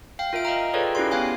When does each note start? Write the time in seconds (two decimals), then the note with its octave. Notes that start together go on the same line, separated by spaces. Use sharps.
0.19 F5 G5
0.33 F4 A#4 E5 D7
0.45 D#5 F5 G5 A#5
0.73 F4 G#4 A4 B4 C#5 D5
0.95 C#4 E4 F#4 G4 D5 C6
1.11 B3 C#4 F5 G5 G#5 C6